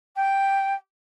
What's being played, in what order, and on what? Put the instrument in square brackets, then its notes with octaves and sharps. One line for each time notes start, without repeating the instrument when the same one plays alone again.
[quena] G5